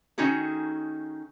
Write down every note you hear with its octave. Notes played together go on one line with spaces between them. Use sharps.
D#3 A3 C#4 D#4 F#4 G#4